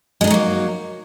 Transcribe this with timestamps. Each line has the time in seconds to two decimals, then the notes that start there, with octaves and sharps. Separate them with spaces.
0.21 G#3
0.24 D4
0.27 D#4
0.31 F#3
0.34 A#3